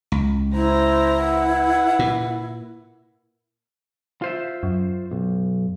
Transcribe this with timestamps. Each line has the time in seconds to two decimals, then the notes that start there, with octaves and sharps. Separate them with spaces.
0.12 C#2
0.55 E4 C5 A#5
1.24 B4 F#5
1.99 A#2
4.22 F4 C5 E5
4.63 F#2
5.11 B1